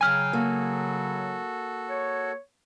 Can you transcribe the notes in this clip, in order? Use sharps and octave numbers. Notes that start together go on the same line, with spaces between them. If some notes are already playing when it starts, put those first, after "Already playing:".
C#3 F#3 F5 G5 G#5 F6
A#3 F#4 A4
C#5